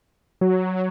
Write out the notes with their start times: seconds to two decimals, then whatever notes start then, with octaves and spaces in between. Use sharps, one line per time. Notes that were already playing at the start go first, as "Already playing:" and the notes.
0.41 F#3